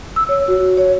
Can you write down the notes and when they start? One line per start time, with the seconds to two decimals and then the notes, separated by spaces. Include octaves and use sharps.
0.16 E6
0.29 C#5
0.48 F#4
0.77 C#5